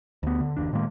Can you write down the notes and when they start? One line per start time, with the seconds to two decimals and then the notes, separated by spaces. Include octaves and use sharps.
0.23 D2 B3
0.41 D3
0.56 F#1 D#2 D4
0.73 A2 D#3 G#3 A#3